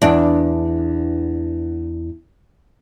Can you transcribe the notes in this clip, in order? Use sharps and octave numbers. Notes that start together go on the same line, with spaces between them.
E2 D4